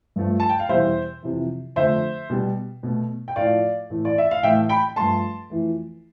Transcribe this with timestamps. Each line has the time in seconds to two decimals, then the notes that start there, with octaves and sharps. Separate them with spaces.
0.16 G2 F3 A3
0.40 A5
0.49 G5
0.59 F5
0.69 E2 B2 G3 C5 E5
1.23 F2 C3 E3
1.76 F2 D3 A3 C5 E5
2.30 B2 G3
2.83 B2 A3
3.28 G5
3.36 A2 F3 A3 D5 F5
3.90 A2 E3 A3
4.05 D5
4.18 E5
4.31 F5
4.43 A2 E3 A3 E5 G5
4.69 G5 B5
4.96 G2 F3 A3 A5 C6
5.50 F2 E3 A3